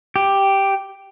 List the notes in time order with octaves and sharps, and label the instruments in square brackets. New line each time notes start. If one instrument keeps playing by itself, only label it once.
[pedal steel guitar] G4